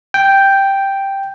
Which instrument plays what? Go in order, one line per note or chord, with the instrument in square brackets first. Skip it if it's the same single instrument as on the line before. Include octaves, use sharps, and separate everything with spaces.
[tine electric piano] G5